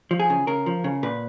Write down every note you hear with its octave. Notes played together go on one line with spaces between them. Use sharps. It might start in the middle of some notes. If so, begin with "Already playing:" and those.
F3
G#4
C#3
C#3 A#4
F3
C#3
A#2 B4